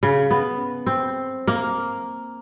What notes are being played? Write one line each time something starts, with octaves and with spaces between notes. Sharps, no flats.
C#3
B3
C4
A#3